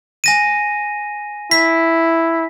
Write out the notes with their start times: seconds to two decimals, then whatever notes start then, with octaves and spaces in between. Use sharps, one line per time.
0.24 G#5 A#6 D#7
1.51 E4 B6